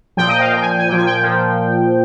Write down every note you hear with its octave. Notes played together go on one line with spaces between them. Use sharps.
A#2 F3 G5
D#5
F5
A#2 F3 G5
G#5
G5
G#5
A#2 F3 G5
G#5
G5
A#2 F3